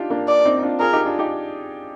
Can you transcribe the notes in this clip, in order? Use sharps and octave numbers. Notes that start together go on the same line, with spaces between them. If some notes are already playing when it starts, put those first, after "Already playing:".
Already playing: D4 D#4 F4 G4
A#3 D4
D5
C4 D#4
D#4
D4 F4
F4 G#4 A#4
D#4 G4
D4 F4
D#4 G4